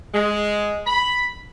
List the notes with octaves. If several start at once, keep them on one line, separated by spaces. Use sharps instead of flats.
G#3
B5